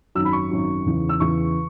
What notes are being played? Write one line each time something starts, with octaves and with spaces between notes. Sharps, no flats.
G#1 F#2 F#3 E6
B5
C#6
G#1 F#2 F#3
E2 C#3 E3
E6
E2 C#3 E3 C#6